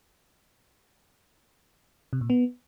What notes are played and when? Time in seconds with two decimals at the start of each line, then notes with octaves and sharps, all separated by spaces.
2.13 C3
2.21 A#2
2.30 B3